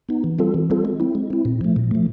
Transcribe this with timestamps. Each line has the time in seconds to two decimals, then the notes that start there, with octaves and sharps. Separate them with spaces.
0.09 B3 D#4
0.24 E3
0.39 G3 C4 F4 A4
0.54 E3
0.70 G3 C4 F4 A4
0.85 G#3
1.00 C4 E4
1.15 G#3
1.30 C4 E4
1.45 A#2
1.61 F3 A3
1.76 A#2
1.91 F3 A3